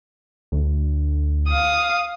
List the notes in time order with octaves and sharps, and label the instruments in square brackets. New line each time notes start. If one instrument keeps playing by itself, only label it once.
[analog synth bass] D2
[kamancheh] F5 D#6